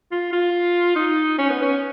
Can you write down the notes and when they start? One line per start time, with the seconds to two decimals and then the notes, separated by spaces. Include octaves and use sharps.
0.11 F4
0.32 F4
0.96 D#4
1.38 C#4
1.50 B3
1.62 C#4